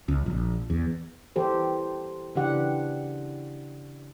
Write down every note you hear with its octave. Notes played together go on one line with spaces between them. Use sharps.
C#2
A#1
E2
E3 G4 A4 C5
C#3 E3 D4 G4 F#5